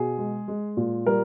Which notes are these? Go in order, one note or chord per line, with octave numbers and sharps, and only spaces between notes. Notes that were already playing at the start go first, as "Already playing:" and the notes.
Already playing: B2 G#4
G#3
G#3
A#2
G3 A#4